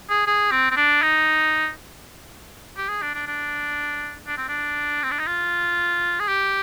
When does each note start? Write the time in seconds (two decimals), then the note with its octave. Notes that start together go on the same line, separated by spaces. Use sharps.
0.10 G#4
0.26 G#4
0.52 C4
0.71 C4
0.76 D4
1.02 D#4
2.77 G4
2.89 G#4
3.02 D4
3.14 D4
3.27 D4
4.27 D4
4.37 C4
4.48 D4
5.03 C4
5.11 D4
5.19 D#4
5.27 F4
6.20 G#4
6.28 G4